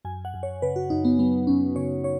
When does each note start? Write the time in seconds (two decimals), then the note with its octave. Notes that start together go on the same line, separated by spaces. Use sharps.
0.05 F#2 G#5
0.25 F#5
0.34 F#2
0.43 C#5
0.62 C#3 B4
0.76 F#4
0.90 F#2 D#4
1.05 B3
1.19 F#3 B3
1.47 F#2 C#4
1.76 C#3 C#5
2.04 C#5